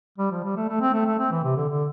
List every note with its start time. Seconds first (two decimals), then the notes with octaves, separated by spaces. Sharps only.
0.18 G3
0.31 F3
0.44 G3
0.56 A3
0.69 A3
0.81 C4
0.93 A3
1.06 A3
1.19 C4
1.31 E3
1.44 C3
1.56 D3
1.69 D3